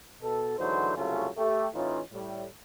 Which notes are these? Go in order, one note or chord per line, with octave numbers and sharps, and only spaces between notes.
B2 A4
G#2 D3 E3 F#3 C5
C2 C#3 F#3 A3 C#4 F4
A3 G4
A2 E3 C#4 D#4 F4
A2 G3